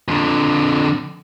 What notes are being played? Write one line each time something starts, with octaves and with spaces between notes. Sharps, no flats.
F2 D3